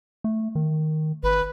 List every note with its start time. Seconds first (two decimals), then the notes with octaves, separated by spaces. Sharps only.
0.24 A3
0.55 D#3
1.23 G#1 B4